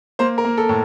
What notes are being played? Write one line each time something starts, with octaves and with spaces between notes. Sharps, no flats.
A#3 C5
A#4
A#3
A4
A2